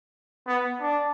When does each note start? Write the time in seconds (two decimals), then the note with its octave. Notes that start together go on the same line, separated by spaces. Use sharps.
0.47 B3
0.81 D4